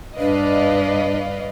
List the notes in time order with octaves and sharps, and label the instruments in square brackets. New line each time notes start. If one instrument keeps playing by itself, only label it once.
[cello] G2 D5 [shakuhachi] D4 [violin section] B4 D#5 F5